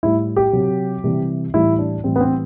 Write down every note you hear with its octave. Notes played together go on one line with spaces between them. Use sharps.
A2 G3 E4
G4
C3 F#3
C3 E3 G3
A2 E3 G3 E4
D4
A2 E3 G3 C4
B3
C4